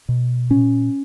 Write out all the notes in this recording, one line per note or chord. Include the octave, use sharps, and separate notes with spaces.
B2
A#2 C#4